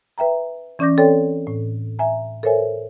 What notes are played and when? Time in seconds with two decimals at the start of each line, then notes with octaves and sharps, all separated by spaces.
0.18 B4 E5 G5 A#5
0.79 E3 C#4 D5 D6 G6 A#6
0.98 C4 A4 C#5 D5 G5
1.47 A2
1.99 E5 G#5 A#5
2.43 A4 A#4 C5 C#5 E5 G#5